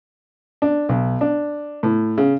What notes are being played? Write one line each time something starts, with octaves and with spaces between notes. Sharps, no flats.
D4
B1
D4
A2
C#3